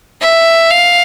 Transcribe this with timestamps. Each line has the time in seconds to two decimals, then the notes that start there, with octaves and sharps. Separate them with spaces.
0.21 E5
0.70 F5